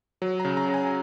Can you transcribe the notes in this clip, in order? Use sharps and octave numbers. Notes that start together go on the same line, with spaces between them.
F#3
A#5
C#3
A#5
C#3
G#5